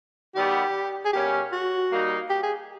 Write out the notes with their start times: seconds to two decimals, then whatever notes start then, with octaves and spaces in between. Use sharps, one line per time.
0.35 D#3 G3 B3 G4
1.05 G#4
1.13 B2 G3 A#3 C#4 G4
1.52 F#4
1.91 G3 A#3 D#4
2.30 G4
2.43 G#4